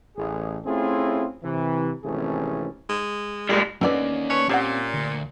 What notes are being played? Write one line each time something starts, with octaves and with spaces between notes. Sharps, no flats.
A1 G#4
A3 C4 C#4 E4 F4 G#4
C3 E3
G#1 C3 E3 A3 C#4 G#4
G#3
A#2 G3 G#3
D3 G3 A#3 B3 C#4 D#4 D5
A4 B4 C#5
A#2 C4 G4 E5 F#5
D2